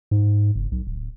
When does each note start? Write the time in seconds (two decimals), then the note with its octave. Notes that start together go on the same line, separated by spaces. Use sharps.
0.11 G#2
0.55 F#1
0.72 B1
0.87 D1